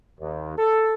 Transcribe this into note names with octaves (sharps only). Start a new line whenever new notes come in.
D#2
A4